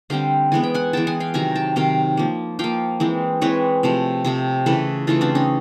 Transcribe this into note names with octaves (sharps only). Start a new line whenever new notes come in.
D3 G3 C4 F5 G5
E3 G#3 B3 G#5
G5
F#5 G#5
E3 G#3 B3 G5 A5
F#5 G#5
F5 G5
C3 D#3 F#3 G#5 A#5
G5 A5
C3 D#3 F#3 F5 G5
F3 A#3
F3 A#3 F5 G5
E3 G#3 C4
E3 G#3 C4 B4 C#5
C3 F3 A3
C3 F3 A3
C#3 E3 A3 A4 B4
C#3 E3 A3 D#4 F4
C4 D4
C#4 D#4